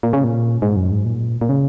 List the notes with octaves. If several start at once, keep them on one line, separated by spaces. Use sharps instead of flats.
A#2
C#3
A#2
G#2
F#2
G#2
A#2
A#2
C#3